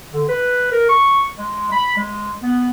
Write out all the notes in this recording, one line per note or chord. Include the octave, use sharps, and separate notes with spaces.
D3
B4
A#4
C#6
G#3
B5
G#3
B3